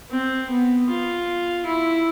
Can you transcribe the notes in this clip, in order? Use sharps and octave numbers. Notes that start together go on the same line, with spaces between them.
C4
B3
F4
E4